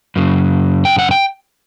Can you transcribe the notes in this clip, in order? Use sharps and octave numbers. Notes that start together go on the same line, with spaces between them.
F#2 C#3
G5
F#5
G5